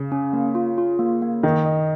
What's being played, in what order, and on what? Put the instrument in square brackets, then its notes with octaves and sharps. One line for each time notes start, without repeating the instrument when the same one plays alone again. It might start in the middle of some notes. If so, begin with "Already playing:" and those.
Already playing: [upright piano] C#3
[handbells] C#4
A#3
F4
F4
A#3
A#3
[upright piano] D#3 [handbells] D#5
[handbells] D#5